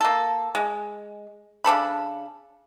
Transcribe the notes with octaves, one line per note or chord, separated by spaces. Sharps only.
A#3 A4
G#3
C#3 D4 A4 B5